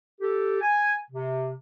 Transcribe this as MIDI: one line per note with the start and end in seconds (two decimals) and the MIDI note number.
0.21 0.58 67
0.21 0.58 69
0.61 0.95 80
1.11 1.53 48